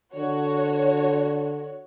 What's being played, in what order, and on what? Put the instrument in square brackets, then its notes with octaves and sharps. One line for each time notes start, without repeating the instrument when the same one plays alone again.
[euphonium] D3 [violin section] F#4 C#5